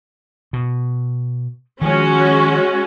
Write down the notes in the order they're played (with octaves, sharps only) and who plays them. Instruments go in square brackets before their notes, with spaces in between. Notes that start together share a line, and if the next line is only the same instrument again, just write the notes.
[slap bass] B2
[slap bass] D#3 F3 [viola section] G#3 C#4 F#4